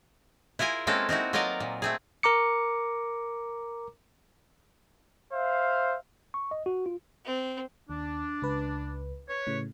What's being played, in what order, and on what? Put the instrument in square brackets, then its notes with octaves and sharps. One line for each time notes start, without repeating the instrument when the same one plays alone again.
[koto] E4 F4 G#4 A#4 G#5
G#3 A#3 C4 C#4 A4
C4 D#4 E4 F#4
F#3 D#4 F4 A#4 D5 D#5
A#2
A3 C4 G#4
[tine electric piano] A#4 A#5 D6 C#7
[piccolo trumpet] C5 [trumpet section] E5 F5
[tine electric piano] C#6
D#5
F#4
F4
[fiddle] C4
[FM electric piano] D#2 [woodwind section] D4
[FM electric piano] C#2 B4
[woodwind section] B4 C#5
[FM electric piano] A2 C#3